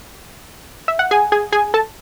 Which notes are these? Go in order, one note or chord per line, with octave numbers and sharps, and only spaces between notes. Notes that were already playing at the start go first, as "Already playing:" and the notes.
E5
F#5
G#4 G#5
G#4 G#5
G#4 G#5
A4 A5